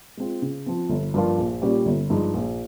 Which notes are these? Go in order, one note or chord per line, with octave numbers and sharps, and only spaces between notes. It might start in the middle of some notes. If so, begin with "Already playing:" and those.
G#3 C4 F4
C#3
F3 C4
G1
G2 F3 A#3 F4
A#1
A#2 G3 C#4 G4
G1
G2 F3 G#3 D#4
A#1